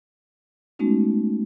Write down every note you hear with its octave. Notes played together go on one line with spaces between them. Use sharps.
G#3 A3 B3 C#4 D#4 F#4